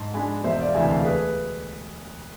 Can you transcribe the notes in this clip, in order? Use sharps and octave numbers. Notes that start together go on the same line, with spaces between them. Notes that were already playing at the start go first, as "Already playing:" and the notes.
Already playing: G#2 A5 C6
G#3 D4 G#5 B5
E1 C5 E5
D5 F5
D2 C3 E3 A3 E5 G#5
F5 A5
G#4 B4